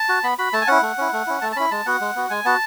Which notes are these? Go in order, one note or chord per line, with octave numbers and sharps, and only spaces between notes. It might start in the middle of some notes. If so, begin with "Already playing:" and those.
Already playing: A5
F#4
B3 B5
F#4 B5
A3 A5
G#5
C#4 E4 F#5
A3
C#4 E4
A3
C#4 E4
A3 A5
A5
C#4 E4 B5
G#3 A5
B3 F#4 F#5
G#3
B3 F#4
G#3 G#5
B3 F#4 A5